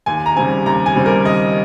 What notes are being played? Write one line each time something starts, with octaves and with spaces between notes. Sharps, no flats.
D#2 G#5
A#5
C#3 G3 C4 G#5
D#2 A#5
G#5
C#3 G3 C4
A#4
D#2 D#5